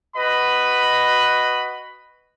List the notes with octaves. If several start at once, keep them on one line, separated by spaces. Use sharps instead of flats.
F#4 B4 D#5 B5